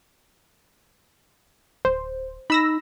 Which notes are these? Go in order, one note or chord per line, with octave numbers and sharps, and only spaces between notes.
D1 C5
D#4 B5 E6 A#6